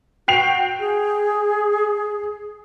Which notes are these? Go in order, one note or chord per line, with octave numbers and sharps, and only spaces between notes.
F#4 G5 C7 F7
G#4